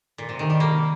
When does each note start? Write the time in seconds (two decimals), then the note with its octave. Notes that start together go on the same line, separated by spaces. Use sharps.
0.18 A#2
0.29 C3
0.39 D#3
0.50 G3
0.60 A#3